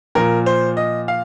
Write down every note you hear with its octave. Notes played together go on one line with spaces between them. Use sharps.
A#2 F3 A#4
C5
D#5
F5